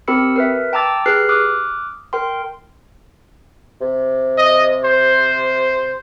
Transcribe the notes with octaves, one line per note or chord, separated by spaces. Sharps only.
C4 G4 A#4 B5 E6 C#7
A#4 B4 E5
G5 A5 A#5 D6 E6 A6
G4 G#4 B4 F6 F#6 C7
D6 D#6 F6 F#6
A#4 G5 C6
C3
D#5
C5